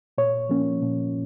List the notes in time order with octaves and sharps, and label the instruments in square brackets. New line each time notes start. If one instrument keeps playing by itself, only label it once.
[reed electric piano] A#2 C#5
F3 A#3 C#4
A#2